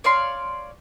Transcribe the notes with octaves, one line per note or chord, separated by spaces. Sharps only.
C#5 D5 F5 C6